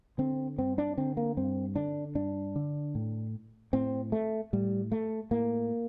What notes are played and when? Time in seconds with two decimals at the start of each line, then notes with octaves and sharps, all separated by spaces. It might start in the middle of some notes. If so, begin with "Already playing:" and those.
0.18 D3 C4
0.58 G2 C4
0.78 D4
0.97 D3 C4
1.17 A#3
1.37 G2 C4
1.76 D3 D4
2.15 G2 D4
2.56 D3
2.95 A2
3.73 A2 C4
4.12 A3
4.53 A2 G3
4.92 A3
5.31 A2 A#3